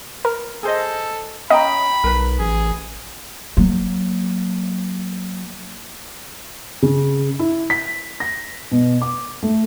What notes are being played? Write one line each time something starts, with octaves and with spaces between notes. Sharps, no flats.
A#4
G#4 A4 C5 D#5
C#4 D#5 G5 A#5 B5
B1 A#4 B4
A1 G#4
F#3 A#3
C#3
E4
B6
A#6
B2
D6
A3